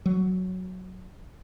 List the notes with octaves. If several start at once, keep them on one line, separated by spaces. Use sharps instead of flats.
F#3